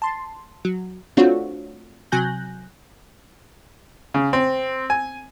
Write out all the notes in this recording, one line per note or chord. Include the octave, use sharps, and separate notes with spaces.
A5 C6
F#3
A3 C4 D4 F4 F#4 C#5
C3 F#3 G#5 F#6 G6 A#6
C#3
C4
G#5